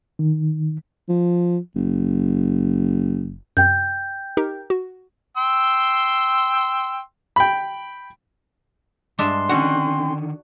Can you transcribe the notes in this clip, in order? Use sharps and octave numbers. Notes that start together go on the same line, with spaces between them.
D#3
F3
F#1
F#2 C3 G5 G6
D#4 G4 A#4
F#4
G5 C6 E6
G5 B5
G2 G#3 D4 E5 C6
D3 D#3 C4 C#4 F#4 F#5